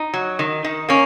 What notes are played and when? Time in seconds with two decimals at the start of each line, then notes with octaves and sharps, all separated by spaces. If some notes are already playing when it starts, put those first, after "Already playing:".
Already playing: D#4
0.14 F#3
0.39 D#3
0.64 D#3
0.89 A#3 C#4